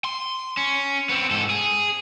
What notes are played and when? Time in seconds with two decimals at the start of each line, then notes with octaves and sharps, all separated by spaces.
0.05 C6
0.57 C#4
1.09 B3 C4
1.31 G#2 A4
1.50 G#4